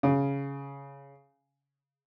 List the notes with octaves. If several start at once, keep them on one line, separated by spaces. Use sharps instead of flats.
C#3